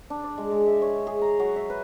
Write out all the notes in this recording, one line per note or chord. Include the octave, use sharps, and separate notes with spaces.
D4
D5
G#3
G#3
E5
C#5
G#4
A#5
F#3
E5
B4